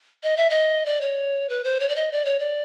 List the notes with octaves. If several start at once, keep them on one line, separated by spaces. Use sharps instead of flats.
D#5
E5
D#5
D5
C#5
B4
C5
C#5
D5
D#5
D5
C#5
D5